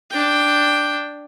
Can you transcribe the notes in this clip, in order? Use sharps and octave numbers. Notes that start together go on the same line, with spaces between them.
D4 G5